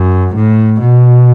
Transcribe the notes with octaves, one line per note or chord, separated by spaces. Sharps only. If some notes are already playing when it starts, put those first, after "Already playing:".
Already playing: F#2
A2
B2